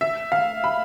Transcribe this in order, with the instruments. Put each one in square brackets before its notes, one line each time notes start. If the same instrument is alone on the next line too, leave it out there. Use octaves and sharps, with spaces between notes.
[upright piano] E5
F5
B5